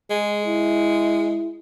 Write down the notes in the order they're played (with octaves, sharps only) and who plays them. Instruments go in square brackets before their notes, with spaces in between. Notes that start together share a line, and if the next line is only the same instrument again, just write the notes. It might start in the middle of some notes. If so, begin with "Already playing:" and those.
[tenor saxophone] G#3 [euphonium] G#4
[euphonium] E4